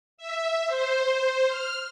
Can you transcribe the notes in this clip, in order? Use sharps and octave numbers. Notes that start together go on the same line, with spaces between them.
E5
C5
F6